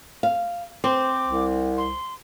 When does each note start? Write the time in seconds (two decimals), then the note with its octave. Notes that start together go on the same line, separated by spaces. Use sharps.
0.23 F5
0.84 C4 C5 D6
1.28 C2
1.78 C6